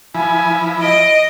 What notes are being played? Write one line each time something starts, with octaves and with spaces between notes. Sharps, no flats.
F3 E4 G#5 B5
D#5 D7